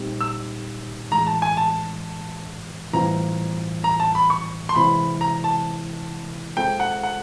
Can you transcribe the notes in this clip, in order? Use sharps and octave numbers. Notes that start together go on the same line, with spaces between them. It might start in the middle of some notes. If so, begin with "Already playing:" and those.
Already playing: A#2 G3 C4 D#4 G4
E6
A2 E3 G#3 A#5
A5
G#5
A5
A2 E3 G3 C4 F4 A#5
A#5
A5
B5
C#6
C6
C3 E3 G#3 C4 E4 B5
A#5
A5
G#3 C4 F4 A4 G5
F#5
F#5